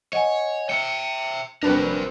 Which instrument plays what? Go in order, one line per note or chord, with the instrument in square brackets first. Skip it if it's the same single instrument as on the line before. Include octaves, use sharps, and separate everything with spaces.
[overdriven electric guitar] C#5 [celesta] D#5 F#5 G#5
[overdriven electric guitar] E5 G5 [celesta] C#7
[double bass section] F1 G3 C4 [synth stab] D4 B4 [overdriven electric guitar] F#4 A#4